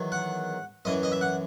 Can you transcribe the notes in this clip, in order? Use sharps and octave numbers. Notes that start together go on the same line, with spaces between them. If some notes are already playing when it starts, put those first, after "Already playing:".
Already playing: E2 D#3 F#3
F#5
F#2 E3 D#5
D#5
E5
F#5